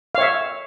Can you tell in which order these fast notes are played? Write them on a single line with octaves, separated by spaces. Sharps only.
F5 C#5 E5